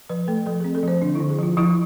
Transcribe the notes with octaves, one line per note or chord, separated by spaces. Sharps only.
F3 B4
A3 A4
F3 A4
G#4
C4
A4
F3 C5
D3 D4
E4
D3
G#4
F3 F4
F3 E4